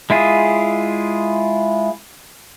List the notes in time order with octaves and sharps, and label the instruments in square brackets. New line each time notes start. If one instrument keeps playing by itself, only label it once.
[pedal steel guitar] G#3 E4 F4 G#4